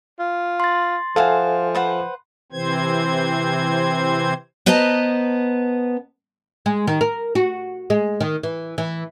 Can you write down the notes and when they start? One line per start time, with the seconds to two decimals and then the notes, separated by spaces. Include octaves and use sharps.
0.19 F4
0.60 C6 A6
1.16 F3 F#4 A4 C5 E5 F5 G#5
1.74 B4 C5 F#5
2.52 C3 E3 C4 C5 G#6
4.66 B3 B4 C5 D#5 A5 A#5
6.66 G#3
6.87 D#3
7.01 A#4
7.35 F#4
7.90 G#3
8.20 D#3
8.43 E3
8.78 E3